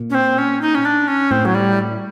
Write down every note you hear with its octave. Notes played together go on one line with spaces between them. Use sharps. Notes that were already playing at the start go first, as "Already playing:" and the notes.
Already playing: A#2
C#4
C4
C#4
D#4
C#4
D4
C#4
A2 C4
F#3
G3